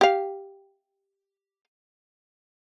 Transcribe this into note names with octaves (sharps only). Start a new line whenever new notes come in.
G4 F5